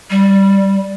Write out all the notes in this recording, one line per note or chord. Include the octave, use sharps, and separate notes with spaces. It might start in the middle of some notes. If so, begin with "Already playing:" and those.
G3